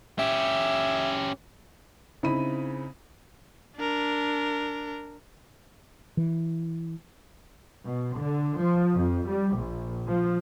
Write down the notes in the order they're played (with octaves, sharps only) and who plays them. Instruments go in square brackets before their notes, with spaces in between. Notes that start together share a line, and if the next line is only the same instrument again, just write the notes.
[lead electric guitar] C#4 G4 [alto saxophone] E5
[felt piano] C#3 C4 D#4 E4 B5 D#7
[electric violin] D4 A#4
[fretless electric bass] E3
[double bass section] B2
D3
F3
F2
G3
A#1
F3